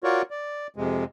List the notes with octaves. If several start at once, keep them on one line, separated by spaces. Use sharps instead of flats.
F4 F#4 A#4 C#5 D5 C#6
D5
F2 C3 G#3